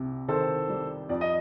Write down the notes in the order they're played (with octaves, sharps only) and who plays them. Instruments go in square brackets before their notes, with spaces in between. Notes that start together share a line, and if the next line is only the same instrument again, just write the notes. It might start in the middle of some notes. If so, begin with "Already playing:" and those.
Already playing: [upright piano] C2 C3
[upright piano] D#3 [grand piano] A4 C5
[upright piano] G3
[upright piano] F2 [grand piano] D5
[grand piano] D#5